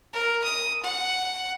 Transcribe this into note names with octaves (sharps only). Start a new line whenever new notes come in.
A#4
D#6
F#5